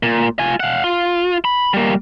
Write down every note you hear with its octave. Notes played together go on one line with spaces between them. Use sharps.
A#2
F4 G#5
F5 F#5
F4
B5
G3 A#3